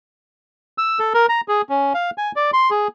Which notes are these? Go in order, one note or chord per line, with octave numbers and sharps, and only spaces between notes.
E6
A4
A#4
A#5
G#4
C#4
F5
G#5
D5
C6
G#4